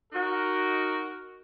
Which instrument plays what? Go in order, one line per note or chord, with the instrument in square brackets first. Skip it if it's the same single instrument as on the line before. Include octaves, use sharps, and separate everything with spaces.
[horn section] D#4 F#4 A#4